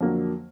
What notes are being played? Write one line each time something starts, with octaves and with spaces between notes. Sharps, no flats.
F2 D3 F#3 A#3